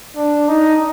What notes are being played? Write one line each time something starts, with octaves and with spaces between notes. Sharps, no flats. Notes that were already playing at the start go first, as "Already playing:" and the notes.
D4
D#4